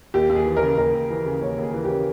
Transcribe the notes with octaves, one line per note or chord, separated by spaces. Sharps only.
D#2 G4
D#2
G#4
E3
A#4
C#3
D#2 A#4
D#2
E3
C#3
D#2 C#5
D#2 G#4
E3
G4
C#3